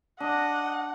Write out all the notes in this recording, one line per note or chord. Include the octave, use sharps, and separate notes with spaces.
D4 D#5 F#5